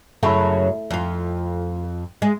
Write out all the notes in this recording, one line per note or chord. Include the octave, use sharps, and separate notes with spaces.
F#2 C#3 F#3 A3 E4
F2 F4
G#3